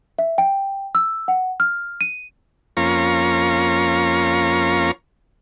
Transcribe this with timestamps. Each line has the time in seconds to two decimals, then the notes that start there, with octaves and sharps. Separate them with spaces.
0.19 E5
0.38 G5
0.95 E6
1.28 F#5
1.60 F6
2.01 D#7
2.77 F2 A#3 C#4 F4 A#5 C#6